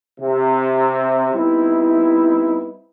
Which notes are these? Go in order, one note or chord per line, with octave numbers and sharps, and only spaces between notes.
C3
G3 B3 C4 D#4 E4